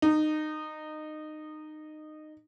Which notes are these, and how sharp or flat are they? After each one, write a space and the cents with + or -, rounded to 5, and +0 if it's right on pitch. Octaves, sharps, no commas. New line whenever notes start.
D#4 -20